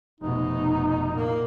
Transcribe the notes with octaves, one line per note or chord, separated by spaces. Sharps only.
F1 B2 D#4
A#2 A#3